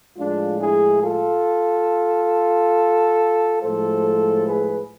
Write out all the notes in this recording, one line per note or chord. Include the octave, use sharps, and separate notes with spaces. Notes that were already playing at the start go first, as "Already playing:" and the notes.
A2 F3 G#3 D4 F4
E4 G#4
F4 A4
A2 F3 G#3 A4 C5
G#4 B4